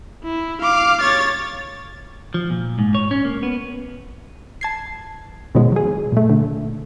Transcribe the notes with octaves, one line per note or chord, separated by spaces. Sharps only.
E4
F5 D6
C#5 A6
F3
A#2
G#2
C#5
C#4
A#3
B3
A5 G#6 C7
B2 D#3 F3 F#3 G#3
F#3 G#4
A#2 A3
D3